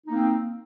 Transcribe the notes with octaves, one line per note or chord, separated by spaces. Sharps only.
A#3 C4 D#4